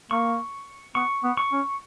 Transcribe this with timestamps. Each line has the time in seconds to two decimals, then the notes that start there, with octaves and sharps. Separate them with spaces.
0.11 A#3 C#6
0.95 B3 C#6
1.24 B3
1.37 C#6
1.52 C#4